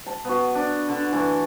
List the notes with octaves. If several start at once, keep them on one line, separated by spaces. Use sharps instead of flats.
A5
B3 F#4
D4
D3
E3 A3